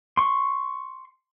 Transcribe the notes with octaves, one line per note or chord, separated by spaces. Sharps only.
C6 C#6